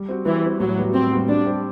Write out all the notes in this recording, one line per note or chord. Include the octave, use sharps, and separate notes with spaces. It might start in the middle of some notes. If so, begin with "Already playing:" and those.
Already playing: G3
C4 F#4
E3 G3
C4 F#4
A2 F#3
G3 B3 F#4
A2 C4
G3 B3 F#4
G3 D4
C4 G4